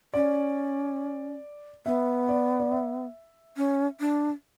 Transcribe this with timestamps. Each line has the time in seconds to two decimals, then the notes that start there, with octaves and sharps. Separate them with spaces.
0.14 C#4 D5
1.86 B3 E5
2.29 D5
2.60 D5
2.72 E5
3.57 C#4
4.00 D4